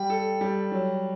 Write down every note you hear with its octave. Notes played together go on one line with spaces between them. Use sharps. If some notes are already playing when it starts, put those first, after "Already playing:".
Already playing: G3 G5
A4
G3
F#3